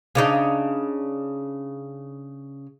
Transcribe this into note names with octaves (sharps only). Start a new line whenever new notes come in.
C#3 D4 D#4